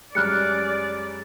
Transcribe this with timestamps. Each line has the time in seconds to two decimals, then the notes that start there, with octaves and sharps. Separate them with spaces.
0.15 F#2 G3 G#3 D5 F6 F#6 C#7